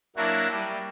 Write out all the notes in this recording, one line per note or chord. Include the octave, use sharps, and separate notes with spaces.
F#3 A#3 D4 E4 F#4
G3